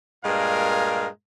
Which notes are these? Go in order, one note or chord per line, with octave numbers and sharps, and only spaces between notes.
G2 A#2 G#3 A#4 F5